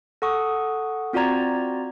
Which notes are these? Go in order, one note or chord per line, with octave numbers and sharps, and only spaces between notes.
A4 F#5 C#6 D#6
C4 F4 F#4 D5 A#5 G#6